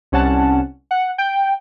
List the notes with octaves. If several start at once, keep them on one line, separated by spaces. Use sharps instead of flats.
C2 C#4 F#5 A5
F#5
G5